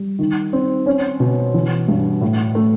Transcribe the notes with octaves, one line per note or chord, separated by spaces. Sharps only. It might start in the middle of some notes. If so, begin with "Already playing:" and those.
Already playing: G3
D#3
C4
C#4
B2
E3
G2
A2
A3